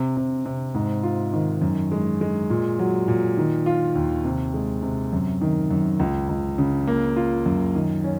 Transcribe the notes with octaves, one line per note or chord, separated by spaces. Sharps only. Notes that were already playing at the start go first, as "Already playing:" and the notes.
Already playing: C3
C3
C3
G#2
F4
D#3
F#2
G#3
G#3
A#2
F#3
A#2
D#3
F4
D#2
C3
G#3
C3
F#2
D#3
F#2
C#2
C#2
C#3
A#3
F4
F#2
D#3
C#4